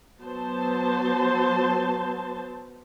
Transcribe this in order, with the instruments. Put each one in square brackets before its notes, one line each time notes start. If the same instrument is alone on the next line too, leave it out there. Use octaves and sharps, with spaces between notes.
[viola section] F#3 B3 C5 A5